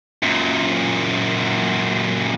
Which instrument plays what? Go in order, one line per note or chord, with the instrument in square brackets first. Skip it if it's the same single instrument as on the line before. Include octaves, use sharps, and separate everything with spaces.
[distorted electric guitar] F#2 A#2